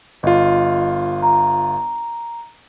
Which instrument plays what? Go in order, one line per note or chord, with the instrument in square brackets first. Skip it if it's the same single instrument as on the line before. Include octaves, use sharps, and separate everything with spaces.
[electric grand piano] G1 F4 [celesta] D#5
[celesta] A#5